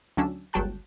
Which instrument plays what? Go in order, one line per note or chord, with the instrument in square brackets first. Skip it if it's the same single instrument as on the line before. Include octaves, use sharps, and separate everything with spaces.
[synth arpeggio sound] D2 F#3 C#4 D4 E6
G1 C#2 F#3 G5 A5 F#6